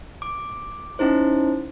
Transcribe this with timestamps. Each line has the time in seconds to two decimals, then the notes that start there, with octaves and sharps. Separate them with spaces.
0.22 D6
0.99 C#4 D#4 E4 C5